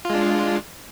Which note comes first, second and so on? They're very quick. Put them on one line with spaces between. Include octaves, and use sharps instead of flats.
F4 G#3 D4